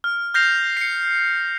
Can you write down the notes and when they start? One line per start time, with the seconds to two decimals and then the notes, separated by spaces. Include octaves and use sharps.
0.04 F6
0.34 F6 G6 A#6 C7 F7
0.77 C7 C#7